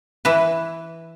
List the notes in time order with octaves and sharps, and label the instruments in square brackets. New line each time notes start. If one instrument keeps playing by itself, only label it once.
[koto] E3 E4 B4